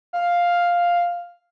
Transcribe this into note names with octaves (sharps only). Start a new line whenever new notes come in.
F5